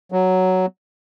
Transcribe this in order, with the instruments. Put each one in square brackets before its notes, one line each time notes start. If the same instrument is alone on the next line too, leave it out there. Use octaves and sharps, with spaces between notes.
[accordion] F#3